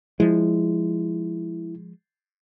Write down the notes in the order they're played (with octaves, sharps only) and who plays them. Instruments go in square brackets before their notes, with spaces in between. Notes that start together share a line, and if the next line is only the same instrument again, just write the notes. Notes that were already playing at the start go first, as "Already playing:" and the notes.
[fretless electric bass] F3 G#3 [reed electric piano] E4